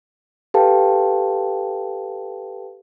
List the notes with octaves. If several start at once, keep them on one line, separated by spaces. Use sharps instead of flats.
G4 A4 B4 F5 G5 A5